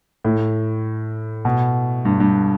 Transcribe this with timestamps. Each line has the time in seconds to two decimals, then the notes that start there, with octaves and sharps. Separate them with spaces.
0.25 A2
1.45 B2
2.05 G2
2.20 G2